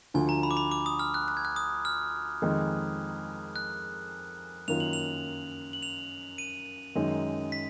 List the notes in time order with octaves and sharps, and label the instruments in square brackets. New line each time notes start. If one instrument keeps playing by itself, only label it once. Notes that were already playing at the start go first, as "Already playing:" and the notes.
[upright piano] D2 D3 F3 [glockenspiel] G#5
[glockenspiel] A#5
B5
D6
B5
D6
D#6
F6
F#6
F#6
G#6
F#6
D#6
F6
[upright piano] F2 D#3 G#3 D#4
[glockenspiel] F#6
[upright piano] F#2 D#3 A#3 F4 A#4 [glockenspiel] F7
[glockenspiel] F#7
F7
F#7
F7
D#7
[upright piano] F#2 D#3 G#3 D#4
[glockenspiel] B6